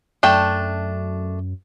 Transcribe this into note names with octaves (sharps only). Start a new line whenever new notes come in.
F#2 A3 D4 G5